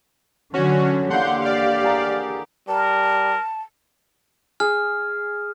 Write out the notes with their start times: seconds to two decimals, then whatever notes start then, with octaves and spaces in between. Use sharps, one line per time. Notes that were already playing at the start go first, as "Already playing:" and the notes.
0.54 D3 F#3 C#4 F#4 C#5
1.10 D3 A#3 E4 G4 F#5 C6 G6
1.41 D5 F5
1.84 G#4 A#4 A#5
2.68 G3 A#4 A5
4.60 G#4 F6